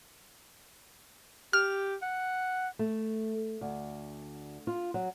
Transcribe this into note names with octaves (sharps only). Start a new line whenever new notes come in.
G4 F6
F#5
A3
D2
F4
F#3